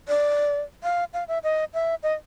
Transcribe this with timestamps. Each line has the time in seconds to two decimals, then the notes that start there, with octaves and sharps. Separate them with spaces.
0.08 D5
0.83 F5
1.13 F5
1.28 E5
1.44 D#5
1.74 E5
2.03 D#5